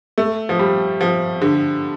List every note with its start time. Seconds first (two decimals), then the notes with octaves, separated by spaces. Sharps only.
0.18 A3
0.49 F3
0.59 G3
1.01 F3
1.41 D3